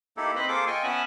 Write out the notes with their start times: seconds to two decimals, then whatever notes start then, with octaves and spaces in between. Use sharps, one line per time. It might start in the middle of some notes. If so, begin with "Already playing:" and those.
0.17 A#3 D#4 E4 G4 A4
0.36 C4 B4 C5 D#5 B5
0.48 A#3 F4 G#4 A4 C5 D6
0.67 F4 D#5 G5 G#5 C#6
0.84 B3 C#4 E5 F#5 G#5 A5